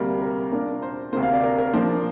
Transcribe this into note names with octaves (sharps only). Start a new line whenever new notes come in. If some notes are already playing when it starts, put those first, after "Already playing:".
Already playing: D2 C3 G3 A#3
A#4
A#2 A#3 D4 A#4
C5
D2 C3 A#3 C5
F5
D5
A#4
A#4
A#2 F3 A#3 D4 C5